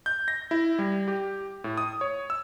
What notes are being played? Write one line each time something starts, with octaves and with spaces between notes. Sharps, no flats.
G6
A#6
E4
G3
G4
A2
D#6
C#5
E6